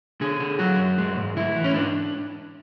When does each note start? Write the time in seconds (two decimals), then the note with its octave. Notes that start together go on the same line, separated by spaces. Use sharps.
0.21 D3 G#4
0.40 D3
0.59 F#3 F#4
0.78 F#2
0.98 G#3
1.17 G#2
1.36 D2 E4
1.56 E3
1.64 C#4
1.74 G#2 D4